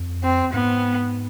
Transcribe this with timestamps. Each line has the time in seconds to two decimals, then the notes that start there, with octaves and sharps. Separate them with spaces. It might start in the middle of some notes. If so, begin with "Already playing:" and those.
Already playing: F2
0.24 C4
0.53 G#2 B3